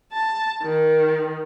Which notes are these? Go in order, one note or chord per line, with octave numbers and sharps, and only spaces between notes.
A5
D#3